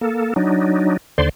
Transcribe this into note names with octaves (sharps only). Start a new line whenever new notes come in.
A#3 A4
F#3 D4 D#4
D#2 D3 C5 D5 C6